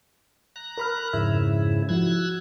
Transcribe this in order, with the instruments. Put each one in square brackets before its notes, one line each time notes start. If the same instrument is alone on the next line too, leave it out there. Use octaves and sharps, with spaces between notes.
[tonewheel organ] A#5 F#6
[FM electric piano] A#4 B5 F6
[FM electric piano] F2 E5 [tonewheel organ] G#2 C#3 E4
[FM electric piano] F3 E4 F#4 [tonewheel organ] E6 F#6 G#6